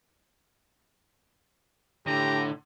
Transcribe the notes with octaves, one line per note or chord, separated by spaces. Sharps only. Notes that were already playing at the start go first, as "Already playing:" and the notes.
A2 D3 G4 A#5